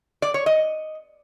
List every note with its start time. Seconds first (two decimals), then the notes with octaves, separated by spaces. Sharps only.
0.22 D5
0.34 C#5
0.46 D#5